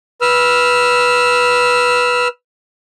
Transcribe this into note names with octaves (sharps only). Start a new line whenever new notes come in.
B4 E6 F6